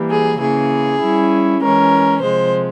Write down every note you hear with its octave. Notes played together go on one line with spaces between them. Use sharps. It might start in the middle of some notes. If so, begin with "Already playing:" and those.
Already playing: E3 G3 A#3
G#4
C#3 E3 A#3 G#4
G3 C#4 E4
E3 G#3 C#4 A#4
C3 F3 G#3 C5